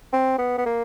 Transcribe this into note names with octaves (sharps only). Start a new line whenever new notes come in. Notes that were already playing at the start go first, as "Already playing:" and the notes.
C4
B3
B3
A#3